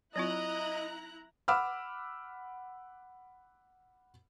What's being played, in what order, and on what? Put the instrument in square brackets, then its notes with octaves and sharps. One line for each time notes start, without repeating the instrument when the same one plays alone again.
[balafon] F#3 C4 F4 [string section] E4 A#5 F#6 [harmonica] D#5
[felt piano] F#5 B5 D6 E6 F6